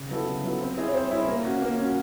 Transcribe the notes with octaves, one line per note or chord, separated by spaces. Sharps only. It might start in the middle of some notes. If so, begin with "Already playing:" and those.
Already playing: C#3
F#3 B3 E4 A4
C#3
F#3 B3 E4 A4
C4
E4 G#4 C#5 E5
C#5
C4 C5
E4 G#4 C#5 E5
A#3
C#4 F#4
A#3
C#4 F#4